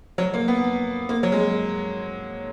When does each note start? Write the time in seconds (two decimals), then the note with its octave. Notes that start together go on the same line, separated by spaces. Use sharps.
0.18 F#3
0.34 A#3
0.48 B3
1.09 A#3
1.23 F#3
1.32 G#3